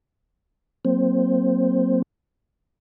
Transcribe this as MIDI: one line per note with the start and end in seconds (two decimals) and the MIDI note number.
0.85 2.02 54
0.85 2.02 58
0.85 2.02 60
0.85 2.02 72